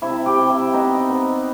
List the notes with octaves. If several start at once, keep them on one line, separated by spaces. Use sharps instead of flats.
C3 E4 E5
G4 G5
C3
E4 E5
B3 D#4 D#5
B3